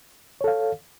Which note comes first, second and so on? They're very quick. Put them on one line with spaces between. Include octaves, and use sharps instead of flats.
C#5 A4 F5